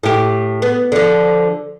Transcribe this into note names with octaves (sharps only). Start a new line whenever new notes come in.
A2 G4
B3
D3 F3